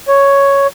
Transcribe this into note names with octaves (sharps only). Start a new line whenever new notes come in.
C#5